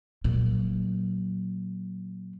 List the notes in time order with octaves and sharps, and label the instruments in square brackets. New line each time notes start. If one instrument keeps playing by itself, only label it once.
[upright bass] A#2 F#3